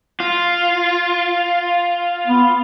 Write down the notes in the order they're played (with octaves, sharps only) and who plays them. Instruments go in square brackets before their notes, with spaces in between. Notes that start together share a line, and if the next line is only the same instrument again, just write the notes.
[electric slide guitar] F4
[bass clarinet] B3